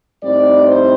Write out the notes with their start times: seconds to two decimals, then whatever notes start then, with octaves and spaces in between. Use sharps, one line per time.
0.22 A2 G3 C4 D#4 D5
0.66 C5